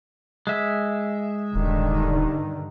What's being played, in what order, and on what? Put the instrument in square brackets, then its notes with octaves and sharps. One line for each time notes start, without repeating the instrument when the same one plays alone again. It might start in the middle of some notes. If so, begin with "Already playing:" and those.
[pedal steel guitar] G#3 E5
[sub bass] D#1 [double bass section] G2 D3 D#3